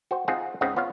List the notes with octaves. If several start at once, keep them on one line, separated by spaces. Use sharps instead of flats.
F#4 C5 G5
C4 D#4 F4 G#4 F#5
C#2 G#2 C#3 C4 D#5 F#5
B3 F4 C#5 F5